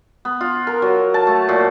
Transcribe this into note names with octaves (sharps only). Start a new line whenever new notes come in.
B3
F4
A#4
F#3
A5
A3
A#2